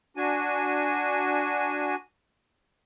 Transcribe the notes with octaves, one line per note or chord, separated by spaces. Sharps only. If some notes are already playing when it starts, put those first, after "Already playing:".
D4 F#4 G#5